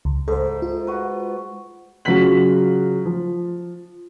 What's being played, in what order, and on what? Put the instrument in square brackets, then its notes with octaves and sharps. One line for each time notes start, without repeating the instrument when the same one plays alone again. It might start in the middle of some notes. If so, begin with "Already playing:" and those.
[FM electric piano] C#2
[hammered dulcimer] G#2 E4 [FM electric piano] A4 C5
[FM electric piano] F4
[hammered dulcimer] F#4 B4
[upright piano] C#3 F#3 F4 F#5 B6 F#7
F3